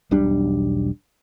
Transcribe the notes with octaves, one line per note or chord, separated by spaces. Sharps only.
E1 B1 G3 D4